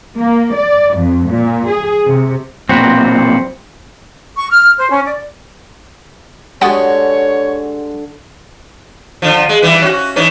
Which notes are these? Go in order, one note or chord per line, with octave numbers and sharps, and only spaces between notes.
A#3
D5
F2
A#2
G#4
C3
B1 A#2 C4 F#4 B4
C#6
F6
C5
C#4
D5
D3 G#3 F#4 G4 C#5 F#5 D#6 A6
D3 F3
G#3
E3 G3 E4
C#4 F#4
E3 C#4 D#4